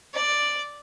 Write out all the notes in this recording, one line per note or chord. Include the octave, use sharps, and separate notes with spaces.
D5